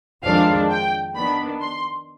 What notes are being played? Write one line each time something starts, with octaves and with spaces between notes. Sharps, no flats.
F2 D#3 G#3 D4 F5
G5
D#3 B3 D4 B5
C6